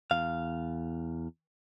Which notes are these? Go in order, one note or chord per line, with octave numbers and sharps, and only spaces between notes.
E2 F5